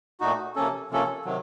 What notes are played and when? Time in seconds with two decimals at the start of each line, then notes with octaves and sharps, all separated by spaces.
0.20 A#2 A3 D#4 F#4
0.56 C3 F3 A#3 C#4 A4
0.91 C3 F3 A#3 C#4 A4
1.25 C3 D#3 F#3